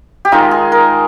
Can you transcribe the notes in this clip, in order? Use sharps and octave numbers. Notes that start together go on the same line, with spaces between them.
G4
D#3 G#3 D#4 F4
G#4
A#4